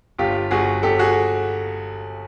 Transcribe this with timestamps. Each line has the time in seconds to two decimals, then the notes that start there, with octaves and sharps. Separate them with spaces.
0.18 G1 F4 G4
0.51 G1 F#4 G#4
0.83 G1 G4 A4
0.99 F#4 G#4